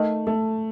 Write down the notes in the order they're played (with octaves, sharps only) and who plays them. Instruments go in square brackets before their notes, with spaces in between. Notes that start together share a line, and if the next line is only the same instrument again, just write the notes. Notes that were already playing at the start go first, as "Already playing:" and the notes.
Already playing: [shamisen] D#3 [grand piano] A3
[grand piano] A3